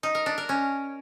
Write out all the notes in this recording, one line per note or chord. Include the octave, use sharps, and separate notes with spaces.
D#4
A#4
D4
A#4
C#4